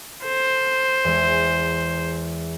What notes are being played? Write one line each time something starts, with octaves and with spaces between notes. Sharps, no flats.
A4 C5
E2 G#3